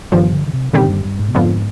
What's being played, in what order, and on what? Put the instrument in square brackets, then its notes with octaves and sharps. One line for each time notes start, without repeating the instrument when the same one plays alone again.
[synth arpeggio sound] G1 G2 F3 [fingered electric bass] D#3
[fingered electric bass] D3
D3
C3
[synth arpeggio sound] D#2 D3 G3 C4 G4 [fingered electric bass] B2
[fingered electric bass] G#2
G2
G2
G#2
B2
[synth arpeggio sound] F2 D3 F3 B3 [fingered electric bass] G#2